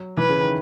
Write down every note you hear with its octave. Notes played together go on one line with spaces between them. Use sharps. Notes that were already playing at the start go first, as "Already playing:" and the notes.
Already playing: F#3
E3 B4
C#3
D#3